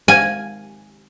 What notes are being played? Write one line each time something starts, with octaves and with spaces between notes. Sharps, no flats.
G#5